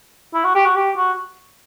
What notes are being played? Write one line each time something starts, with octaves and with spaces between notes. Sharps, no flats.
E4
F#4
G4
F#4
G4
F#4